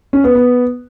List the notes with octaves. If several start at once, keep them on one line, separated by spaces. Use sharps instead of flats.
C#4
B3
B3